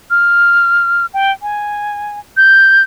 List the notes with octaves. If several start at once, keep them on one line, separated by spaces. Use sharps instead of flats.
F6
G5
G#5
G6